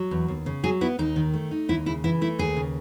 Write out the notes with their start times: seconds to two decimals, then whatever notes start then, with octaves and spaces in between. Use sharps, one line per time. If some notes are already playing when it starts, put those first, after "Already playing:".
Already playing: F#3
0.11 E2
0.28 D#2
0.46 C#3
0.63 F#3 G#4
0.81 B3 E4
0.99 D#2 D#4
1.16 D#3
1.34 A3
1.51 D#4
1.69 D#2 E4
1.86 C#3 E4
2.04 E3 E4
2.21 A3 E4
2.39 D#2 G#4
2.57 C#3